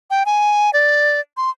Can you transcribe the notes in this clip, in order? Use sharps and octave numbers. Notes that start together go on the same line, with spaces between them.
G5
G#5
D5
C6